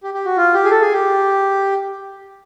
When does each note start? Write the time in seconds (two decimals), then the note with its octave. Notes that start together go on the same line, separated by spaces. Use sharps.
0.03 G4
0.14 G4
0.25 F#4
0.37 F4
0.54 G4
0.64 G#4
0.70 A4
0.81 G#4
0.92 G4